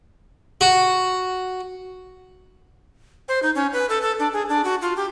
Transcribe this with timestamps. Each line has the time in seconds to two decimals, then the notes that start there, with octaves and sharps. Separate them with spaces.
0.61 F#4
3.28 C5
3.43 D#4
3.55 C#4
3.73 B4
3.89 A4
4.02 A4
4.19 D4
4.33 G#4
4.49 D4
4.64 F#4
4.82 F4
4.97 G4